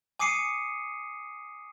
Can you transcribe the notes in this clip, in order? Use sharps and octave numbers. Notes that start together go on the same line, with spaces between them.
G#5 D6 D#6 C7 C#7 D#7